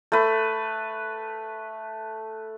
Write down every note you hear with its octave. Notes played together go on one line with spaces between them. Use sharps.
A3 B4